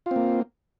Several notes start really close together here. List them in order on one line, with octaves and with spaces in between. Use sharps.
F4 C4 A#3